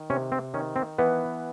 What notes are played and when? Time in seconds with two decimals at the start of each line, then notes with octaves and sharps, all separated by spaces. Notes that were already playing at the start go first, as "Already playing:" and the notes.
Already playing: D#3
0.10 C3 C#4
0.32 C4
0.54 D#3 C#4
0.76 C4
0.98 E3 B3